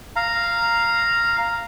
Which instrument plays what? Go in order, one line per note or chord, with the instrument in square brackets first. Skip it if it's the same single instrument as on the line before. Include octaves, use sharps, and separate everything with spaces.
[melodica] F5 A#5